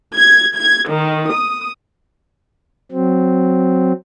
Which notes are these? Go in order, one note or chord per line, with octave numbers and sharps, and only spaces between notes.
G#6
G#6
D#3
D#6
F#3 C4